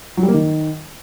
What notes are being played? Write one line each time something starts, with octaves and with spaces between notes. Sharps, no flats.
F#3
G3
A#3
D#3